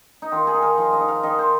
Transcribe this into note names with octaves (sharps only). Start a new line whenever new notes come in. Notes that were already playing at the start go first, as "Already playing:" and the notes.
D#4
D#3 F4
G#4
D#4
A#4
F3
D#5
D#4
F5
D#3 D#5
C5